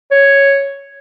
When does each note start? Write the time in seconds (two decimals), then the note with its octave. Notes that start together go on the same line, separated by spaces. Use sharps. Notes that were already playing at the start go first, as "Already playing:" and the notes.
0.11 C#5